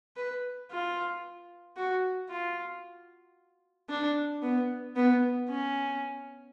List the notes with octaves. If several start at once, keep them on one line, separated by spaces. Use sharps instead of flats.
B4
F4
F#4
F4
D4
B3
B3
C#4